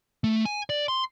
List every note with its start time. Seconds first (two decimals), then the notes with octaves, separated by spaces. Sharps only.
0.24 A3
0.45 G#5
0.70 D5
0.88 C6